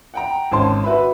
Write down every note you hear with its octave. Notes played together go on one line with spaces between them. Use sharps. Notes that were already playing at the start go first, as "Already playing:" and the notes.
F#5 G5 A#5
G#1 C#4 A5 C6
F#4 B4 E5 B5